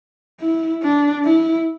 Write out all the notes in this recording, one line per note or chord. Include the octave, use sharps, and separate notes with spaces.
E4
D4
E4